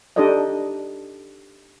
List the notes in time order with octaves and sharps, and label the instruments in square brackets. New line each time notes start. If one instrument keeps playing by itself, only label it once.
[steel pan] D4 D#4 G4 A4 D5 D#5